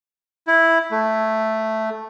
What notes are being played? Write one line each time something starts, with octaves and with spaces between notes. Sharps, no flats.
E4
A3